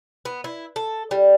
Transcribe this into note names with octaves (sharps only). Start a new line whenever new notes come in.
B3
E4
A4
G3